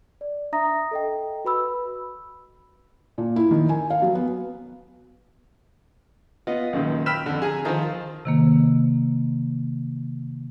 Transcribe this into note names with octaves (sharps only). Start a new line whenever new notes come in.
D5
D4 E5 A#5 D#6 A#6
A4 D#5 G5
F#4 B4 B5 E6
A#2
E4
D#3
G#5
F5
F#3
B3
B3 F4 D#5
C#2 F#2 A#2 D#3
G5 B5 E6 F6 B6 E7
F2 D3
G#4 G#5 A#5
D#3 F3 F4 C5 A#5
C3 D#3 A#3